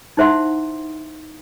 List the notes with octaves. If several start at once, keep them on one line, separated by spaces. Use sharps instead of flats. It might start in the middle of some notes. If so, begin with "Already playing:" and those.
D#4 E4 C5 E5 F#5 C6